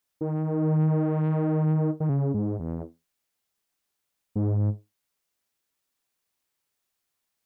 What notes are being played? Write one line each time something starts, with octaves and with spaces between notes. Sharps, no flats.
D#3
D#3
C#3
G#2
E2
G#2